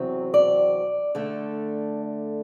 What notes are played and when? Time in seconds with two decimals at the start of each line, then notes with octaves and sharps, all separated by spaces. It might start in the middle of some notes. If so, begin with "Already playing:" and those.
Already playing: E2 C3 F#3 C4
0.34 D5
1.15 D3 A3